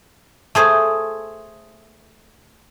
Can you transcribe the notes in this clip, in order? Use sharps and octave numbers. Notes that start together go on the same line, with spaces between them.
A3 G#4 C5